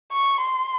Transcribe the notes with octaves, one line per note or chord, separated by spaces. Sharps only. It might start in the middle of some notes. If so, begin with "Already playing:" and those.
C#6
C6